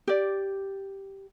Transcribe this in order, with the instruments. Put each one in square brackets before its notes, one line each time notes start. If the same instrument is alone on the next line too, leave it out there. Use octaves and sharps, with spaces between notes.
[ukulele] G4 D5